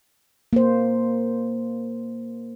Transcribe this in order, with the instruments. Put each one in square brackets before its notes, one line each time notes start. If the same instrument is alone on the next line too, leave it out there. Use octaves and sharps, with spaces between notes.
[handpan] A#3 C5